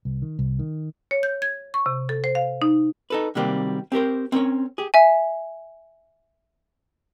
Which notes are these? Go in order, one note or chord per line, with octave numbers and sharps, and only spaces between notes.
C2
D#3
C2
D#3
C#5
G6
G#6
C#6
C3
A4
C5
F5
D#4
D#4 A4 B4
C3 D#3 F#3 G3 A#3 C4
C4 G4 A#4 C5
C4 C#4 A#4 C#5
G4 G#4
E5 G#5